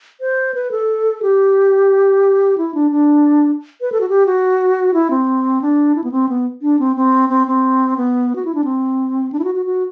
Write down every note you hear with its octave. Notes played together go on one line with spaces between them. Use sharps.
C5
B4
A4
G4
E4
D4
D4
B4
A4
F#4
G4
F#4
E4
C4
D4
E4
B3
C4
B3
D4
C4
C4
C4
C4
B3
F#4
E4
D4
C4
D4
E4
F#4
F#4
F#4